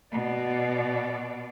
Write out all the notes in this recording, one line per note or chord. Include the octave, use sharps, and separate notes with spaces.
B2 D5